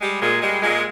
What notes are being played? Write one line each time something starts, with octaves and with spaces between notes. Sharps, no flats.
G3 G#3
A#2 G#3
G3 G#3
A#2 G#3